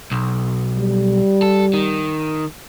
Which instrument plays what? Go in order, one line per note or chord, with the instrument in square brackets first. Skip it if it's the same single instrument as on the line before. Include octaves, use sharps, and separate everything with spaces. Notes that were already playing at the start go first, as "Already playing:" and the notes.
[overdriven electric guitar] B1
[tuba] G3
[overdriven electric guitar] A4
D#3